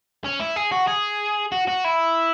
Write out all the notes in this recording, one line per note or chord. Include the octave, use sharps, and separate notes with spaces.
C#4
E4
G#4
F#4
G#4
F#4
F#4
E4